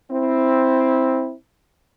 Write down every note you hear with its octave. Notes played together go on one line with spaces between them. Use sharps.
C4 E4